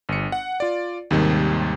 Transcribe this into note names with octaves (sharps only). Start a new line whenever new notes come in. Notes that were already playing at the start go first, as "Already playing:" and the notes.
G1 C#7
F#5
F4 D5
D#2 G#2 C3 D#3 G3